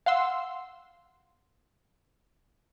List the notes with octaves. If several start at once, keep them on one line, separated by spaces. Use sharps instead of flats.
F5 F#5 C6 E6